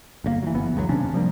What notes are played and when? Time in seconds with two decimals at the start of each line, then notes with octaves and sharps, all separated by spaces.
0.24 G1 C3 A#3
0.43 E3 F#3
0.54 F#1 E3 B3
0.76 F#1 C#2 B2 F#3
0.89 D#2 C3 C#4 D4
1.13 C3 F3 G3 A#3